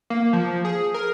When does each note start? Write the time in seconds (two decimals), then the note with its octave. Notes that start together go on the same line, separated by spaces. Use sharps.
0.10 A#3
0.33 F3
0.65 G#4
0.94 A#4